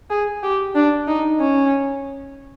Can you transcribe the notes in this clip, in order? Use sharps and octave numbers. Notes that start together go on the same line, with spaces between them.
G#4
G4
D4
D#4
C#4